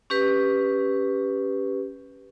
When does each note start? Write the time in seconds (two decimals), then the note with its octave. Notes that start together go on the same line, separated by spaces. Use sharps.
0.10 C#4 G4 B4